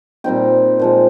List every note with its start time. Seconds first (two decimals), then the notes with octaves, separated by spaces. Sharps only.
0.24 A#2 G3 C4 D#4 G5
0.79 A#2 F3 G#3